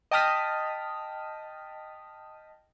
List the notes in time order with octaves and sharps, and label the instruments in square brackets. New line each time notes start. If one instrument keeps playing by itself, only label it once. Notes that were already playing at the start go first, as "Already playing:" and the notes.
[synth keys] D#5 G5 A5 D#6 F6 B6